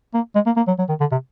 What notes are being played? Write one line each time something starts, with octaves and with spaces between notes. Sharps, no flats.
A#3
G#3
A#3
A#3
F#3
F#3
D#3
D3
C3